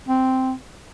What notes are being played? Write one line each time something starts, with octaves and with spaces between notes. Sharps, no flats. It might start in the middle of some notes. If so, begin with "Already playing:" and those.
C4